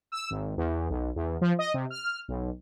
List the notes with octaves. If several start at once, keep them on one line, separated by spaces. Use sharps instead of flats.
E6
G#1
E2
B1
E2
F3
D#5
C3
F6
B1